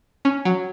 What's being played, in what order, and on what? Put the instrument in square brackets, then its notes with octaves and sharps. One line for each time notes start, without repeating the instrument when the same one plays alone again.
[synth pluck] C#4
F#3